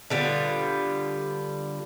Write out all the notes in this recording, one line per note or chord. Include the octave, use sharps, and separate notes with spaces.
D3 G3 B3 F4